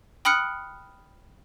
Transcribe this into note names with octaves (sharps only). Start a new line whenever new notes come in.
G5 B5 D#6 F6 F#6 C#7